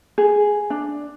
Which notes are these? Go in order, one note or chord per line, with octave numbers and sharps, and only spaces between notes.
G#4
D4